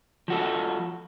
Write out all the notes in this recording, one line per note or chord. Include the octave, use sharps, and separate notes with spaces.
F3 F#4 A4